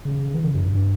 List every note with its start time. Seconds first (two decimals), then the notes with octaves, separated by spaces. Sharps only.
0.05 C#3
0.19 C#3
0.34 E3
0.44 C#3
0.54 F#2
0.64 G2